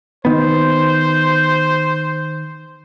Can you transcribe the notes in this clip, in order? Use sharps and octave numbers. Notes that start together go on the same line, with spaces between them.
D#3 B3 C5